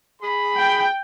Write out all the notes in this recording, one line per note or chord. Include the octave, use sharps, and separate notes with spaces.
G#4 B5
G5